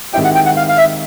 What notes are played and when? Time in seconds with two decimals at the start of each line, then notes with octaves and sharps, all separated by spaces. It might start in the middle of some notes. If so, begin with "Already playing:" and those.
0.13 D#3 G#3 C4 E4 G4 G5
0.24 F#5
0.35 G5
0.46 F#5
0.57 F5
0.69 F5
0.78 E5